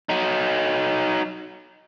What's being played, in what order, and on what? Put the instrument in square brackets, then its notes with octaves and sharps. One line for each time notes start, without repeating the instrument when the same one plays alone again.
[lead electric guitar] F#3 D#4